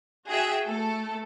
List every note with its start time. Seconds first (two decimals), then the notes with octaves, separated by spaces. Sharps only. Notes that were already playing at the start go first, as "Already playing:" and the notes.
0.27 F#4 G#4 E5 G5
0.65 A3 A4